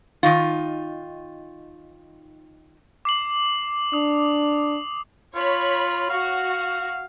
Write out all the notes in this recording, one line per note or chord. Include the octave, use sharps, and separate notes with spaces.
D#3 D#4 F4
D6 C7 F#7
D4 D#6
F4 C#5 B5
F#4 F5